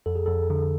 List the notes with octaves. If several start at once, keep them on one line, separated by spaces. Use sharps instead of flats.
F2 A4
G#4
F2 A4
D3